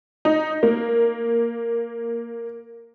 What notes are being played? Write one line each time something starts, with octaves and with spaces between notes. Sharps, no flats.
D#4
A#3